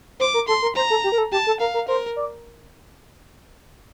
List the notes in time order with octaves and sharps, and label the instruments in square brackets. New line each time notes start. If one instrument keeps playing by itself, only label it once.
[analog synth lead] C5 [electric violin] D6
[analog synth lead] A#4
[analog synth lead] A4 [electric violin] C6
[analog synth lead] A#4
[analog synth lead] C5 [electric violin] A#5
[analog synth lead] A4
G4
A#4
A4
[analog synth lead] G4 [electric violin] A5
[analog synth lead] A4
[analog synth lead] A#4 [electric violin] F5
[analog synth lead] A#4
[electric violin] A#4 [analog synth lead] C5
[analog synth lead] D5